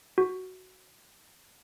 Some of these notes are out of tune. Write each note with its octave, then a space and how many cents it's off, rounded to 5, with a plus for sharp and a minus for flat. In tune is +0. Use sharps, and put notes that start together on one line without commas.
F#4 +5